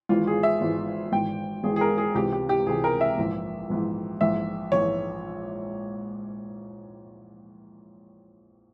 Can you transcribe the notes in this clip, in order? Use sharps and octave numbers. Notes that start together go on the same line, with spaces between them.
G#1 G#2 E3 F4
G#4
E5
G#1 G#2 E3
G#1 G#2 E3 G5
G#1 G#2 E3 G#4
G#4
A#4
G#4
C#2 C3 E3 G4
G4
G4
C#2 C3 E3 G#4
A#4
E5
A#1 G#2 E3
A#1 G#2 E3
A#1 G#2 E3 E5
A#1 G#2 E3 C#5